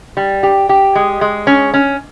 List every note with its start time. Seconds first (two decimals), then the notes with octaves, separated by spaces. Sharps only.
0.17 G3
0.43 G4
0.69 G4
0.95 G#3
1.21 G#3
1.47 C#4
1.74 C#4